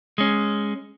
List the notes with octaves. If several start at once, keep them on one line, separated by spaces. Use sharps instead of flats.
G#3 C#4